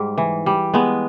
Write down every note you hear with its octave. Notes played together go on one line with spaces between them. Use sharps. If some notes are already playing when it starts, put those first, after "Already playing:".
Already playing: G#2 G3
E3
G3
G#3 B3